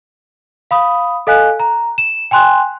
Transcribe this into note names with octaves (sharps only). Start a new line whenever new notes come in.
F5 B5 D#6
A4 D#5 F5 G#5 F#6
A#5
E7
G5 G#5 C6 F#6